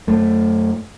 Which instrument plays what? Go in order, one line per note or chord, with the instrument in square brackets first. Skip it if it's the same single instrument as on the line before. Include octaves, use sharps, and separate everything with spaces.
[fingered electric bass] F#2 A3